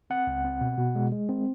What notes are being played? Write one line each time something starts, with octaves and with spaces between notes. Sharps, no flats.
C4 F#5
C#2
C4
B2
B2
G#3
G#3
C4